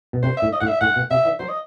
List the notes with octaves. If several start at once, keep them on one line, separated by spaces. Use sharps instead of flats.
B2
C3 C5
E5
A2
D#5
A2 F#5
E5
A2 F#5
B2
C3 E5
E3
F#3 C5
D#5